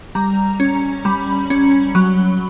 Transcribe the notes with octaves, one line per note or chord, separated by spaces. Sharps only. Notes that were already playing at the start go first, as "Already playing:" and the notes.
G3 A#5
C#4
G3 B5
C#4
F#3